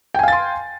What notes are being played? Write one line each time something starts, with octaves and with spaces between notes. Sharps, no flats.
F5 G5 G#5 C6 A6